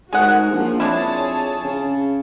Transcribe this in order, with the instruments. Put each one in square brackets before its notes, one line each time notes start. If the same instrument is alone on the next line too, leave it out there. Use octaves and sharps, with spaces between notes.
[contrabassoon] G#2 [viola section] G#3 F#4 A#4 [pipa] G#4 F#5
[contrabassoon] A#1 [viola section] F3 C#4
[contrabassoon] F2 [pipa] G#3 D4 E4 [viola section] G#4 C#5 A5
[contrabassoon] C#3